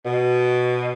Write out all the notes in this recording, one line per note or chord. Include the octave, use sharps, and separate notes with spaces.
B2